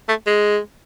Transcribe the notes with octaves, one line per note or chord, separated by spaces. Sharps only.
A3
G#3